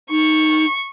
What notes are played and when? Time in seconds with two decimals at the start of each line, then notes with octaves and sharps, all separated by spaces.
0.10 D#4 C#6